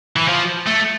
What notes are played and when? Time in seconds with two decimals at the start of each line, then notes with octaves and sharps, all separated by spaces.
0.16 E3
0.28 F3
0.67 A3